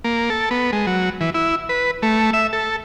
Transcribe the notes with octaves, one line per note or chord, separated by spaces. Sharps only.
A#3
A4
B3
G#3
F#3
E3
E4
B4
A3
E5
A4